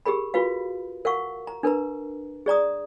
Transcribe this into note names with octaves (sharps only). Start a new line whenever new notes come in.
G4 G#4 A#4 B5
F4 F#4 B4 F5
A#4 F5 F#5 C#6
A#5
D4 A#4 B4 A#5
G#4 D5 A#5 D#6